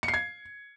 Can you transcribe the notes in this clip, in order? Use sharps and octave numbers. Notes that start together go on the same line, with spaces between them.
C#7
C7
G#6